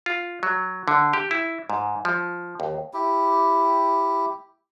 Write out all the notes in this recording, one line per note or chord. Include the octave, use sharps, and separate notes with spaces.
F4
F#3
D3
G4
E4
G#2
F3
D#2
E4 G4